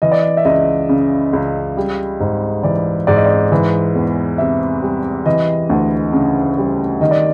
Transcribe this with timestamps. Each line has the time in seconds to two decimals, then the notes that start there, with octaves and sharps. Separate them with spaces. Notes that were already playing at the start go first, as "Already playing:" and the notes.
0.02 E3 D#5
0.12 D5
0.22 D#5
0.37 E5
0.45 C#2 D#5
0.89 C#3
1.33 C#2
1.77 G3
2.20 G#2
2.63 E3 D5
3.07 G#2 D5
3.16 D#5
3.26 D5
3.52 E3
3.95 E2
4.38 C3 E5
4.82 G3
5.26 E3 D#5
5.69 D2
6.13 C#3
6.58 G3
7.01 D#3 D#5
7.11 D5